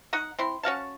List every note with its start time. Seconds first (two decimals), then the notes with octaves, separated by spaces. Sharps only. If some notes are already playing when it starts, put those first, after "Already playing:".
0.13 D#4 D#5 F#5
0.39 C4 E4 C6
0.63 C#4 F#4 F5 A5